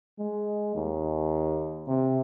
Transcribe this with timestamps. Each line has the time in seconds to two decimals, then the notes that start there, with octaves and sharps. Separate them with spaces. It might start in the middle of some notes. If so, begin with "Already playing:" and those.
0.19 G#3
0.75 D#2
1.88 C3